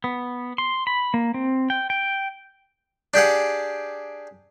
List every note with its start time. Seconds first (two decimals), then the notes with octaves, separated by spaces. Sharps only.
0.04 B3
0.58 C6
0.87 B5
1.14 A#3
1.34 C4
1.70 G5
1.90 G5
3.14 D4 G4 G#4 F#5